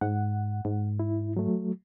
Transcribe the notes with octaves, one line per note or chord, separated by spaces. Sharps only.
G#2 F#5
G#2
E4
F#3 A3